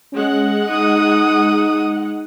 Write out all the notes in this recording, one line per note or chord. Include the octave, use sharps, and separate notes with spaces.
G#3 C#4 F#5
D#4 D#6